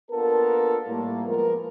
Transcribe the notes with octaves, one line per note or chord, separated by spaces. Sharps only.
A#3 B3 D4 F4 A4 A#4
A2 G3 A#3
F3 G#3 B3 A#4